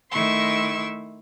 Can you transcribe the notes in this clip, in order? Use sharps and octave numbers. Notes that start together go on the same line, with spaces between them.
D#3 A3 E4 C6 C#6 E6